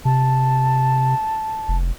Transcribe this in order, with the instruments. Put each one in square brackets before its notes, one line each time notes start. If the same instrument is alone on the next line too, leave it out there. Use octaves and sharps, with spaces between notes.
[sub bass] C3 [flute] A5
[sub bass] F1